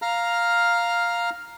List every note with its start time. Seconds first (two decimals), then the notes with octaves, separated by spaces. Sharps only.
0.02 F5 A#5 F6